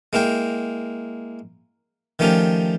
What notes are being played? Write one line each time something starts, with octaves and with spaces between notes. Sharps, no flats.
G#3 A#3 E4 A#4 G5
D#3 F3 A3 C#4 G4 A#4